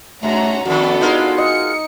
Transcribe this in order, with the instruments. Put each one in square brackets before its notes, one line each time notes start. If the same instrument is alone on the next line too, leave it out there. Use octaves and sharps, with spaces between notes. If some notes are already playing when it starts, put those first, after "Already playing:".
[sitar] G2 [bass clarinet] A3 [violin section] C#4 F#4 A#5
[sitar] F2 D#3 [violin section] B3 D4 A4 [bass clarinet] F#4
[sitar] G#3 F4 A#4 [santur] D#4
[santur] D#5 [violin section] C#7